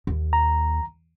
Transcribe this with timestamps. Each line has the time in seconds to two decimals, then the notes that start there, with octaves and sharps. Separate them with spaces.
0.07 D#2
0.33 A#5